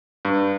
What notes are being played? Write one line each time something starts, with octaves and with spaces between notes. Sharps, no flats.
G2